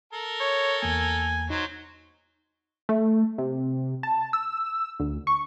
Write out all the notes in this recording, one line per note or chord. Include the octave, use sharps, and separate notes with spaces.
A4 A#4
C#5
E2 A#3 G#5
F#3 D#4 C5
A3
C3
A5
E6
D2
C#6